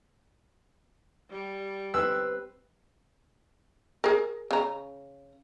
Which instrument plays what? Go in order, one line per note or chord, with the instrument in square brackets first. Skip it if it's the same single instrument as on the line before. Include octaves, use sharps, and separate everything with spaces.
[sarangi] G3
[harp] C4 B4 [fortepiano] E6
[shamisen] G#4 A#4
C#3 A#5